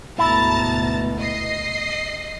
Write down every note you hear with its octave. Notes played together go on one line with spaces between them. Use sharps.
D2 G#2 B2 E4 A5 A#5 A6
D#5 C7